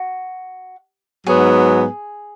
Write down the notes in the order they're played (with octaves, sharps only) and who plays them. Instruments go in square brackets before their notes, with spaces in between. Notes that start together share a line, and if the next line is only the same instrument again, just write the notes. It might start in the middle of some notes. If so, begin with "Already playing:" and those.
Already playing: [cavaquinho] F#4
[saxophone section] G#2 F#3 B3 [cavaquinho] G#4